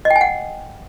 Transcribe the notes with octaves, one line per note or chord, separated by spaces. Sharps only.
D#5
G5
G#5
F#5